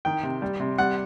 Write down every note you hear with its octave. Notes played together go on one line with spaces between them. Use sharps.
D#3 G5
C3
G3
C3
G3 F#5